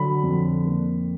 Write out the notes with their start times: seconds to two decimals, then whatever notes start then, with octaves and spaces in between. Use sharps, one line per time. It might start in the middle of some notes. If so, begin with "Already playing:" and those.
Already playing: D3 F#3 B5
0.23 F2
0.65 A#3